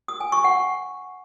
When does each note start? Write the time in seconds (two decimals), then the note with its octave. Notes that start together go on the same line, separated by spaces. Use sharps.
0.08 D#6
0.20 G#5
0.32 C#6
0.44 F#5